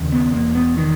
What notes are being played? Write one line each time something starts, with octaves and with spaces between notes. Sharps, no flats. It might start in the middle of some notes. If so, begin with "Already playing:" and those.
Already playing: D#2 C#3
B3
E1 A#3
B3
D#3